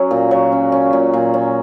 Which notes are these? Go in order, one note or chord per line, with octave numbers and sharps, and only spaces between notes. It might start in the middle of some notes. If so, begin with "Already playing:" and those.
Already playing: F#3 C#4
A#2
F#3
C#4
C#4
A#2
A#2
C#4